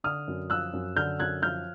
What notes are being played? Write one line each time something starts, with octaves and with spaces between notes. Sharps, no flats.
D3 D#6 F6
F#2
F3 E6 F#6
F#2
D3 F6 G6
F#2 F#6 G#6
F3 F6 G6